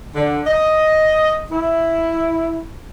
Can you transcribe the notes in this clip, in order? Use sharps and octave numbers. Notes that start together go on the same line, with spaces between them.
D3
D#5
E4